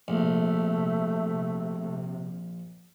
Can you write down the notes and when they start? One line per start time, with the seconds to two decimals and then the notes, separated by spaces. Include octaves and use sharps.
0.08 A#1 C3 A3